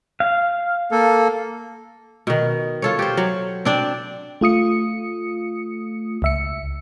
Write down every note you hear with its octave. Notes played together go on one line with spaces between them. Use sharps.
F5
A#3 A4
B2 D#3
F4 A4 C#5
G4 C5
F#3
C4 D4 D5
A3 F4 D#6 C#7
C#2 E5 C#7